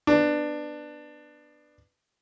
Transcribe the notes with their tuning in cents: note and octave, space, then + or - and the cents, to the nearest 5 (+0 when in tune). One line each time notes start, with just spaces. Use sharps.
B3 +0 D4 +15